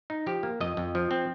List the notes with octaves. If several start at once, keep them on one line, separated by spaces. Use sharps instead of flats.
D#4
F3 G4
A#3
F2 D#5
F2
F3
C4